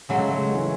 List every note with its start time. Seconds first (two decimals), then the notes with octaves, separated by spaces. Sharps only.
0.09 C#3 F#3 G#3 A3
0.37 G#3
0.51 E3